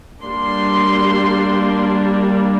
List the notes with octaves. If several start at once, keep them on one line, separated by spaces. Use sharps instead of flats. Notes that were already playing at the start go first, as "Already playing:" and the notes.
G3 A#3 D4 C6